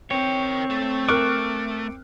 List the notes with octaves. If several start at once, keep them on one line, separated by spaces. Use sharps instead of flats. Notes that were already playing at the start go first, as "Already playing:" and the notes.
C4 A#4 C#5 G5
A3
A#4 C#6 D6 F6 F#6